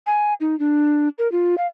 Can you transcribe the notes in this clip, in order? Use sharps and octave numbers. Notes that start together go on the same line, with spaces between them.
G#5
D#4
D4
A#4
F4
F5